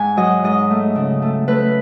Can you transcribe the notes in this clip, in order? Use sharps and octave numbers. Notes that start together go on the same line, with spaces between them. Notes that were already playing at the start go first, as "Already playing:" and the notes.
Already playing: G#2 G#5
F#3 D#5
G#2 D#5
A3
C#3
A3
A3 B4